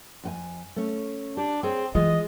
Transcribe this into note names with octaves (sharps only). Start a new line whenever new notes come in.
F2 G5 G#5
A3 C#4
D4 G4
C4 G#4 C#5 G5
E3 G#3 F4 G#4 D#5